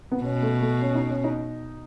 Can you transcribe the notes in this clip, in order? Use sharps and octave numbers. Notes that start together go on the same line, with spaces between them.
B3
B2 C#4
A3
A3
C#4
D#4
C#4
D#4